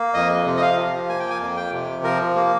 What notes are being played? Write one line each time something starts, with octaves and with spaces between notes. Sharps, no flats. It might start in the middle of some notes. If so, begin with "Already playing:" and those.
Already playing: A#3
F2 D#5
C3
D#5
F5
F3
A#3 G#5
G5
G#5
F2
G5
C3
F3 A#4
A#3